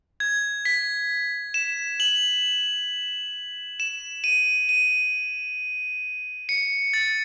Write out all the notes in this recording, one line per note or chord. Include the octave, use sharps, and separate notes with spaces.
G#6
B6
E7
F#7
E7
D#7
D#7
C#7
A6